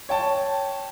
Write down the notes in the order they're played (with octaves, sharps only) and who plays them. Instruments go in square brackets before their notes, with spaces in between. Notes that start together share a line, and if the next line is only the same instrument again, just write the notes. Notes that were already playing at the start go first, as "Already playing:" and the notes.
[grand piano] C#5 G5 A5